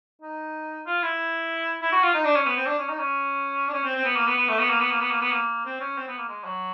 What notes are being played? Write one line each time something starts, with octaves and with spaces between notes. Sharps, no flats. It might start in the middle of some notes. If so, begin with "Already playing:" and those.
D#4
F4
E4
E4
F#4
F4
D#4
D4
C#4
B3
C4
D4
C#4
D#4
C#4
D4
C#4
C4
C4
B3
A#3
B3
B3
A3
B3
A#3
B3
A#3
B3
A#3
B3
A#3
C4
C#4
C4
B3
A#3
G#3
F#3